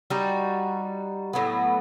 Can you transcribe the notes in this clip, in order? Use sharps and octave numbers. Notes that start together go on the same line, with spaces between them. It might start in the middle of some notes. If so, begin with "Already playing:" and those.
G3 D#4 F#4
A2 F#3 B3